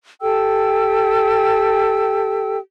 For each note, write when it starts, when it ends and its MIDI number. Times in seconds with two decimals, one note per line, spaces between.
0.22 2.57 67
0.22 2.57 69
0.22 2.57 79
0.22 2.57 88